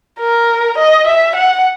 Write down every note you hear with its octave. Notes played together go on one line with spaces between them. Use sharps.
A#4
D#5
E5
F#5